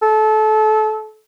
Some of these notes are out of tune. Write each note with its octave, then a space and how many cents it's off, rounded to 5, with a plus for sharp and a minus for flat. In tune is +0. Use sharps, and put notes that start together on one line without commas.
A4 -25